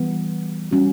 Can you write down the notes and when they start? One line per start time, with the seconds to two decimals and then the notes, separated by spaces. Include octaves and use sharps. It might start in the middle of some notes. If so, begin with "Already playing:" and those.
Already playing: E3 G3 B3
0.71 G3 C#4 F#4